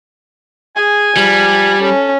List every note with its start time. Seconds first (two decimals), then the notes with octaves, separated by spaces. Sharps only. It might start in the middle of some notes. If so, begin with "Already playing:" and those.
0.76 G#4 G#5
1.17 F3 G3
1.81 C#4 A4